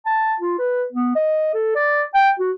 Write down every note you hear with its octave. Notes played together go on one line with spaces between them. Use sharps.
A5
F4
B4
B3
D#5
A4
D5
G5
F#4